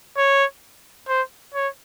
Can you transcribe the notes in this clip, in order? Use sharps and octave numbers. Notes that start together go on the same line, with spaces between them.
C#5
C5
C#5